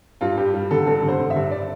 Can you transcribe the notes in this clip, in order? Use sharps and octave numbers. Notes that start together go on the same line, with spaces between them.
G2 F4
G2 G4
G3
D3 A4
G2 A4
D3
C5
D3
E5
G2
D5